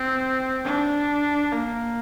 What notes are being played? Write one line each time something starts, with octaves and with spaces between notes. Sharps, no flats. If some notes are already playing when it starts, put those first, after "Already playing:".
Already playing: C4
D4
A#3